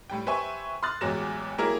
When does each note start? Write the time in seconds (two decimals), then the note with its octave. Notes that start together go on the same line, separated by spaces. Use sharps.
0.10 A2 G3 G5
0.26 G4 B4 C5 E5 G#5 C#6
0.83 C6 D#6 F6 F#6 A6
1.01 A1 E2 F#3 G#3 A#6 E7
1.58 F#3 G3 A#3 E4 G#4 A#4